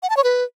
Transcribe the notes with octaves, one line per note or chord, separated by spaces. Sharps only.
F#5
A5
C#5
B4